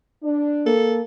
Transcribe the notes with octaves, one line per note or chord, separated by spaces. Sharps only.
D4
A#3 A4